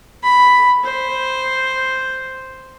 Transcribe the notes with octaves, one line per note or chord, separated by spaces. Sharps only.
B5
C5